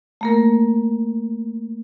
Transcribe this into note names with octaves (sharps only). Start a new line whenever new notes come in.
A3 A#3 A#4